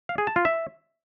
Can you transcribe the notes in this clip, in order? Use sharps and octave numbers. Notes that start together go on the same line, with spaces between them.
F5
G#4
A5
F4
E5